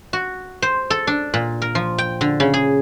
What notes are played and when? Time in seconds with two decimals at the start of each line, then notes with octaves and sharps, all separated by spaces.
0.13 F#4
0.62 C5
0.90 A4
1.07 D4
1.34 A#2
1.62 A#4
1.75 F3
1.98 G5
2.21 D3
2.40 C#3
2.54 G#4